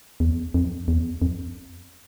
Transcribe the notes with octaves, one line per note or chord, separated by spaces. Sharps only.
E2
F2
E2
F2